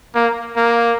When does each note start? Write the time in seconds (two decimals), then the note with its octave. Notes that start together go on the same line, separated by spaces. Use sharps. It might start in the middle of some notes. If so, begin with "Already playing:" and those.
0.15 A#3
0.56 A#3